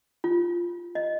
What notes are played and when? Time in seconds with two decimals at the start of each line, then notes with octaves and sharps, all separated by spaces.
0.24 F4
0.95 D#5